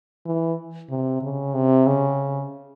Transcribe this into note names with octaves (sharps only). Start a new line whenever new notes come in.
E3
C3
C#3
C3
C#3